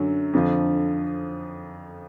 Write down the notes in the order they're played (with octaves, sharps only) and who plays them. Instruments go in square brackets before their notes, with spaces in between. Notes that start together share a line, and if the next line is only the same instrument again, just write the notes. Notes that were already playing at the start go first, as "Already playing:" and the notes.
Already playing: [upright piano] F#2 D3 F#3
F2 D3 F3